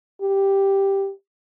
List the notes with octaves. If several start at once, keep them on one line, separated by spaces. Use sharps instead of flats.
G4